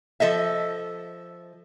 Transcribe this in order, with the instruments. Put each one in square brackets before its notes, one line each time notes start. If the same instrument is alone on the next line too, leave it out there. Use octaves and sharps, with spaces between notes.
[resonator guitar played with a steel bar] F3 A4 D#5 E5